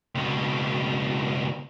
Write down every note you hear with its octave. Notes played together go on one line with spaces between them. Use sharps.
C#2 B2